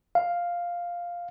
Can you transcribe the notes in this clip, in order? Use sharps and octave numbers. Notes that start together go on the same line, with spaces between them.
F5